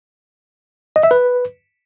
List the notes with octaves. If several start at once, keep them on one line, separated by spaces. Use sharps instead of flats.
D#5
E5
B4